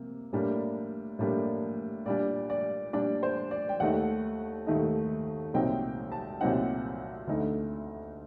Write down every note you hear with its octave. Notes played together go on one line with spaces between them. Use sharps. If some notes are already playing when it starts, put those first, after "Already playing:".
Already playing: C3 A#3
A2 G3 A#3 D4
A2 G3 A#3 D4
A#2 G3 D4 D5
D5
A#2 G3 D4 D5
C5
D5
G5
D#2 D#3 A3 D#4 F#5
D#2 D#3 A3 D#4
C2 A#2 F#3 C4 D#4 G5
A5
C2 A#2 F#3 C4 D#4 F#5
D2 D3 A3 D#4